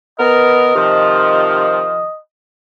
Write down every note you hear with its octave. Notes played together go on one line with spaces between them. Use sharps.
B3 A#4 D#5
C3 D#3 F3